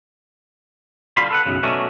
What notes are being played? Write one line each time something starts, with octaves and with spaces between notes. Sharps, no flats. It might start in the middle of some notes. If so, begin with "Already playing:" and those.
D3 G3 F4 B5 C6
A4 B4 F#5
B1 F#2 C#3
B2 F#3 A3 C#4 D4